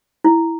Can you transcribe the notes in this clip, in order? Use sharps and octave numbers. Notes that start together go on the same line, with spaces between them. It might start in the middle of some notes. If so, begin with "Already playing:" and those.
E4